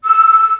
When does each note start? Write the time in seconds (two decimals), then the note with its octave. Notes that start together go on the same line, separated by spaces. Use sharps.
0.04 E6